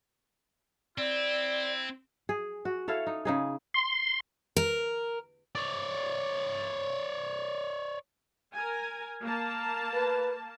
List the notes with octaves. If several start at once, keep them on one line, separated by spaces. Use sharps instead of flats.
C4 E4 D5
G#4
F#4
E4 A4 C#5 F5
D#4
C#3 D#4 G#4
C6
A#4
C#5 D5
A#4 G#5
A#3 A5
B4